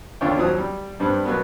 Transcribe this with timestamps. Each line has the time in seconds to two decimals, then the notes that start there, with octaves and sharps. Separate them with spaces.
0.21 D#2 D3 D4 F4 C#5 G5
0.36 D#2 F3 F#3 D#6
0.58 G3
1.00 G2 G3 C4 D4
1.25 B2 F#3 A#3 B3